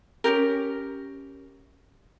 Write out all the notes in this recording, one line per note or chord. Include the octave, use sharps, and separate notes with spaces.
C#4 D#4 G4 A#4